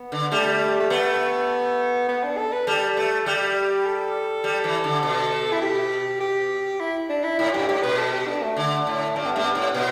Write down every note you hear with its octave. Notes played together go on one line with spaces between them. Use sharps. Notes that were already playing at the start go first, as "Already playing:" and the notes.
Already playing: B3
D3
G3 A3
A3
A3 B3
B3
D4
A4
B4
G3 A4
A3
G3 G4
A4
G3
E3
D3
B2
E4
G4
G4
E4
D4
E4
A2 E4
G2 G4
A2 G4
B2 B4
A4
G4
D4
A3
D3
A2
G2 D4
B3
G2 A3
B3
A2
B2 B3